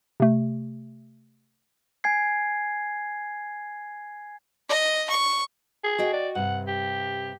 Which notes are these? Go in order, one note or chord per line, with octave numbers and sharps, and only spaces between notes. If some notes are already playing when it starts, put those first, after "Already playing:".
C3 A3
G#5 G#6 C7
D#5
C#6
G#4
F#4 D#5 G5
D5
G2 C3 F#5
G4